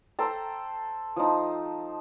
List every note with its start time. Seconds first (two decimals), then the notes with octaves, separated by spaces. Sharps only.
0.19 A4 C5 G5 A#5
1.16 F3 D#4